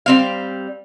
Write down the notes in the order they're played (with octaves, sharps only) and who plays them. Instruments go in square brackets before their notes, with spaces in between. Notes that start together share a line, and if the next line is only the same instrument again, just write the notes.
[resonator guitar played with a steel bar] G3 C4 F5